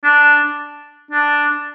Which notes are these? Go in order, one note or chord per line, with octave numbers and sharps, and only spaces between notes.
D4
D4